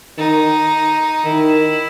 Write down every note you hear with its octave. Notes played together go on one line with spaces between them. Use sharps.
D#3 D#4
D#3 E4